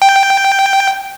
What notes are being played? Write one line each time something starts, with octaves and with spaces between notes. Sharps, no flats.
G5